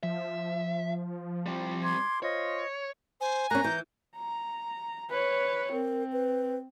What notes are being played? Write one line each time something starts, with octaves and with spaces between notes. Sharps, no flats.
F3 E5
G3 C4
C6 D6 G#6
F4 C5 C#5 D#5
C5 G#5
A#3 C#4 A#5 F#6
E3 G6
A#5
B4 C#5
C4 A#4
B4